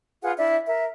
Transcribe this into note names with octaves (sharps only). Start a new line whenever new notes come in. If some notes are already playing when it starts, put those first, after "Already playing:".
F4 G#4 B4 F#5
D4 E4 E5
A#4 E5